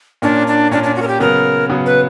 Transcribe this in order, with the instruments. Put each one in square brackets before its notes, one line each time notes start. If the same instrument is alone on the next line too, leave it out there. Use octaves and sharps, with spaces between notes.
[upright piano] A#2 A#3 C#4 [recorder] D4
[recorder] D4
[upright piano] A#2 A#3 C#4 [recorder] D4
[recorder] D4
F#4
A#4
G4
[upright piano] C#3 F#3 B3 [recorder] A#4
[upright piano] C#3 F#3 B3
[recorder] B4